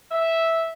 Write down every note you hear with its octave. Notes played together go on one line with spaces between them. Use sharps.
E5